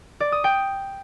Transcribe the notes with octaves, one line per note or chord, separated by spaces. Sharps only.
D5
D#6
G5